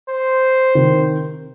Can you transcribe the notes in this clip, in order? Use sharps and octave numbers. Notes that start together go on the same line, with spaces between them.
C5
C3 D#3